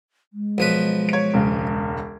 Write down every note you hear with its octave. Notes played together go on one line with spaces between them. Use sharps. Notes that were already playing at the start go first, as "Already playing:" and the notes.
G#3
B1 F3 B4
C#5 D7
E1 C#2 C#3